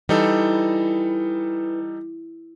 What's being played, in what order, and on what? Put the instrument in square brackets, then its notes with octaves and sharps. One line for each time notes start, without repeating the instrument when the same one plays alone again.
[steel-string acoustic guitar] E3 [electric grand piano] G3 D#4 A4